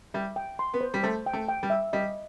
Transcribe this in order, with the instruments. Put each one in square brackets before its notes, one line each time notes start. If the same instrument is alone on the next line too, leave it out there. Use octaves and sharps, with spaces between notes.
[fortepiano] G3 [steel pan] E5
[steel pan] G5
C6
[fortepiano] B3
[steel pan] C5
[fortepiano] G3
[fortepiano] A3 [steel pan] C5
[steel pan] G5
[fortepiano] A3
[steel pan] G5
[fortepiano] G3
[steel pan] E5
[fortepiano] G3 [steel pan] D#5